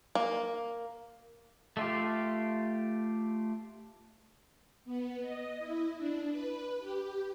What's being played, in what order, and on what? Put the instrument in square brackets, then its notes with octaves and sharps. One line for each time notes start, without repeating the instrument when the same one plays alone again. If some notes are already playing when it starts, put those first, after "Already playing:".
[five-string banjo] A#3
[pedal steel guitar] A3 F4 G4
[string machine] B3
D#5
E4
D4
B4
G4